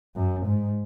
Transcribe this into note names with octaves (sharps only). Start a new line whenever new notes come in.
F#2
G#2